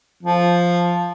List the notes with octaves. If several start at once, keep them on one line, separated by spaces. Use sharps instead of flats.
F3